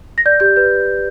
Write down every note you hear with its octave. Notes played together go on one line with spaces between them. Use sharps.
A#6
D5 G6
G4 G6
B4 G6